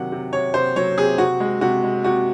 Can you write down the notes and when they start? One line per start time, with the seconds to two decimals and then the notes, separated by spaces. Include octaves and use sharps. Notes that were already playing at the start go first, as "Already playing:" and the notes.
Already playing: C3 D#3 F#3 F#5
0.12 C3
0.32 C3 C#5
0.54 C3 C5
0.76 F#3 C#5
0.98 C3 G#4
1.18 C3 F#4
1.40 G#3
1.61 C3 F#4
1.84 G#3
2.04 C3 F#4